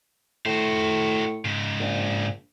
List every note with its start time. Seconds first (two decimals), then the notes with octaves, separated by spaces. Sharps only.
0.46 A2 F#4 C5
1.45 G#2 C#3
1.80 A#1